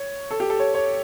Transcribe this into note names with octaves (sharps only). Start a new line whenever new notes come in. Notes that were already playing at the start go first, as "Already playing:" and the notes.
Already playing: C#5
A4
G4
A4
C#5
C#5